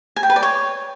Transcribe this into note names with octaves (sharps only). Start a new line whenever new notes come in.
G#5
G5
B4
D5
C#5